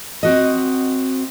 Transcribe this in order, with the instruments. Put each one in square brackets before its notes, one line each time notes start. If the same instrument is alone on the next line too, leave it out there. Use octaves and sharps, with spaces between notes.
[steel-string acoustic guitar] C4 F#4 D#5